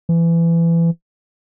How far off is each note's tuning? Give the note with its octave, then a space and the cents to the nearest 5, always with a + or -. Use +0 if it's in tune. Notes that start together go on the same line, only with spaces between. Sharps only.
E3 +25